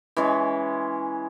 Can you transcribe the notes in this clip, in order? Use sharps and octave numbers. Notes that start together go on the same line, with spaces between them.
E3 G#3 C#4